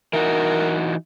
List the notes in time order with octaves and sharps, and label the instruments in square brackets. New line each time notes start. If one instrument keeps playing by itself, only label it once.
[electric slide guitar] E3 D#4 F#4 [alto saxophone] A#4